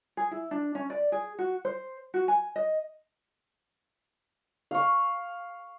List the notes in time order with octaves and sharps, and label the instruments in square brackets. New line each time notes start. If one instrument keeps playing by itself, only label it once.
[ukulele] G#4
E4
D4
C#4
D5
G#4
F#4
C5
F#4
G#5
D#5
[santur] F5 C#6